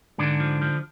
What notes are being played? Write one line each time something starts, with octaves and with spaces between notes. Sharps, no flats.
G#2 D3 D4
F3
F3